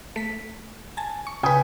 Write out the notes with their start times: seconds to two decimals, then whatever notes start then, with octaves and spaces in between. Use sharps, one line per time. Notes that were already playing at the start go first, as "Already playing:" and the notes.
0.16 A3 B6
0.97 G#5 A5
1.27 C#6
1.43 C#3 B4 G5 G#5 D#6